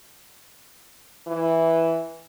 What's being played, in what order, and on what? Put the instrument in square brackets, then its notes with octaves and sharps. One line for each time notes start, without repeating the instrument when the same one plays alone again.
[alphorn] E3